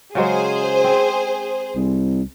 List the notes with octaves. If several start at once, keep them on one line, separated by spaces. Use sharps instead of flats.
C#3 F#3 G#3 G#4 C5
C4
C2